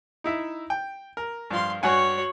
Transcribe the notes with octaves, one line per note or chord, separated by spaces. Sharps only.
D#4 E4 E5
G5
A#4
G2 F3 F5 C6
G2 F#4 C#5 F#5 G#5